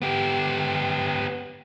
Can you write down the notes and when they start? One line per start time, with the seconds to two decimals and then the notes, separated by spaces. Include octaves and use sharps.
0.02 B3 G4